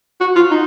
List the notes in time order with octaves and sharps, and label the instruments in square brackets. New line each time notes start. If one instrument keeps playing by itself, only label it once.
[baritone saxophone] F#4
F4
D#4